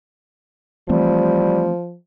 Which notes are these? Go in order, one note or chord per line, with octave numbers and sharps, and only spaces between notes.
E3 F3 G3 A3 C4